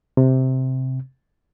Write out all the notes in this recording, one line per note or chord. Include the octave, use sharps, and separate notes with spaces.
C3